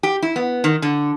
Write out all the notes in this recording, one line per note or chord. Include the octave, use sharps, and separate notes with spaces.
G4
E4
B3
D#3
D3